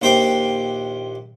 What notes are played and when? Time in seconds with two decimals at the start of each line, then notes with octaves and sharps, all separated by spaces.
0.02 A#1 D#2 C5 G5 D6